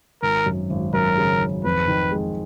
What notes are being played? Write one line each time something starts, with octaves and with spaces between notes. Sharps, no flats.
G#1 A#4
F#2
G#1
F#2 A#4
C#3
G#1
F2 B4
D#3
G#3